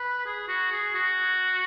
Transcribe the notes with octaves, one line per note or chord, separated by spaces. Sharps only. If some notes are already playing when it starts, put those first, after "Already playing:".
Already playing: B4
G#4
F#4
G#4
F#4